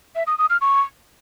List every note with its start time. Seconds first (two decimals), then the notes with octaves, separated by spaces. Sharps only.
0.15 E5
0.27 D#6
0.38 D#6
0.50 F6
0.61 C#6